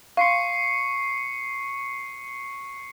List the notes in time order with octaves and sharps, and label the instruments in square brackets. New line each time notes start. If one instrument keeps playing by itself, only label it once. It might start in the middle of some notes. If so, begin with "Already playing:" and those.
[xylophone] F5 C6 [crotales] C#6 C7 C#7